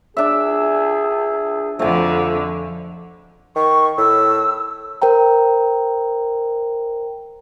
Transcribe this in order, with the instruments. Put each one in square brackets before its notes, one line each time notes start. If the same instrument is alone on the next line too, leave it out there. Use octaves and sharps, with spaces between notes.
[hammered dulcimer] D4 E5 [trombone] G#4
[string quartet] F2 D3 [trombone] F3 [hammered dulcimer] A3 G#5
[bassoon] D#3 [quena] C#6
[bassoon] A2 [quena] E6
[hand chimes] A#4 C5 G5 A#5